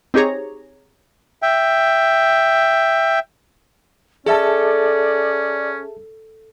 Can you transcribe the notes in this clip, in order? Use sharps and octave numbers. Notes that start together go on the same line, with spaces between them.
C4 D#4 G4 G#4 C#5 A#5
E5 G5
C#4 G#4 A4 D5 E5 A5